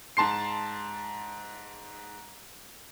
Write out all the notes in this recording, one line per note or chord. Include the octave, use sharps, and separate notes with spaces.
G#2 A5 C6 C7